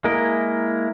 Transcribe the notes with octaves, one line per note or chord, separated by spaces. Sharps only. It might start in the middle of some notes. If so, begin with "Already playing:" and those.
G#3 A#3 E4 A#4 D#5